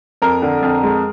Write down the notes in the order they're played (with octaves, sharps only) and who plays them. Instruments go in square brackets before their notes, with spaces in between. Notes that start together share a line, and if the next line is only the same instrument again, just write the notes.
[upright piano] F2 A#4
D3
F2
G#3